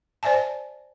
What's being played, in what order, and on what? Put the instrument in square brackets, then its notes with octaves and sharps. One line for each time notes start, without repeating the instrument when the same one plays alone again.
[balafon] C5 D5 E5 G#5 A5